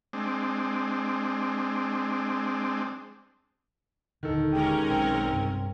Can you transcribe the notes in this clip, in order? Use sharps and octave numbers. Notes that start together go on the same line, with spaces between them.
G#3 C4 D4
D#1 D3 D#3 A4
G#3 C#4 G4 A#4
B1 C4
G2 C3